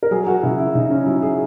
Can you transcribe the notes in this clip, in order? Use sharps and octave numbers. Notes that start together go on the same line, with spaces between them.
A#4
F#3 G#4
F#4
C#3 E4
E4
C#3 D#4
C#4
F#3 E4
G#4